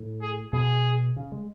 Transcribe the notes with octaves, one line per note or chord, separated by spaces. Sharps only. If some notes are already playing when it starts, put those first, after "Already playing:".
Already playing: A2
G#4
B2 G#4
C#3
G#3